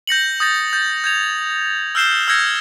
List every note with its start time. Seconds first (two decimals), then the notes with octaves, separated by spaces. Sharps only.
0.07 G6 A#6 C#7 F#7
0.40 D#6 G6 A6 A#6 F#7
0.73 G6 A6
1.04 G6 G#6 F7
1.95 E6 F6 G6 C7 E7 G7
2.28 E6 F6 G6 G#6 A#6 C#7